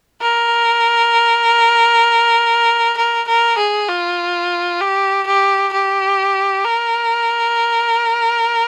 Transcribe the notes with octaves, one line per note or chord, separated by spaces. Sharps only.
A#4
A#4
A#4
G#4
F4
G4
G4
G4
A#4